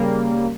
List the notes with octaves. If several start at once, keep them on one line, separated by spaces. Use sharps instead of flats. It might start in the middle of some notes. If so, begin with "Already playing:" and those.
Already playing: C#3 G3 A#3